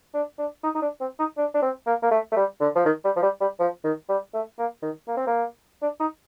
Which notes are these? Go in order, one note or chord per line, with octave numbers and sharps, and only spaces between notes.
D4
D4
D#4
D#4
D4
C4
D#4
D4
D4
C4
A#3
A#3
A3
A3
G3
D3
F3
D#3
G3
F3
G3
G3
F3
D#3
G3
A3
A#3
D#3
A#3
C4
A#3
D4
D#4